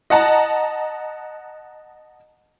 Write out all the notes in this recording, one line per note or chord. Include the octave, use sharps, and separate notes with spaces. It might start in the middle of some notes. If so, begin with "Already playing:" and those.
D#5 F#5 A5 A#5